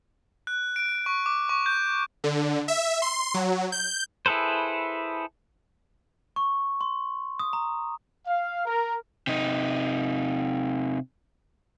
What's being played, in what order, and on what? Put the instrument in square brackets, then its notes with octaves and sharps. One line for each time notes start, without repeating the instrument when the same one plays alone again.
[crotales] F#6
D7
C#6
D6
C#6
G6
[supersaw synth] D3
E5
C6
F#3
G6
[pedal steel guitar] E4 G#4 A4 B4 C5
[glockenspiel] C#6
C6
D#6
A#5
[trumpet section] F5
A#4
[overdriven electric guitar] C3 D#4